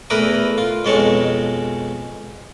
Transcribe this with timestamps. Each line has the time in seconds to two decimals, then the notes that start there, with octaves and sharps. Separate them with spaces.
0.10 E2 A3 E4 A#4 B4 D#6
0.58 F4
0.85 F2 B2 G#3 C#4 A5 C#6